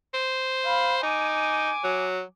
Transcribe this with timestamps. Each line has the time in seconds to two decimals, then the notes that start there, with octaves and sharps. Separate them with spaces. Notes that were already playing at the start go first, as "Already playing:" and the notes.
0.14 C5
0.65 F5 B5
1.03 D#4 G#5 D6
1.84 F#3